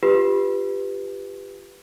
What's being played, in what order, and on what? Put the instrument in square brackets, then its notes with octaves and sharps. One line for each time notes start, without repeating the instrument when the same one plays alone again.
[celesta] F4 G4 B4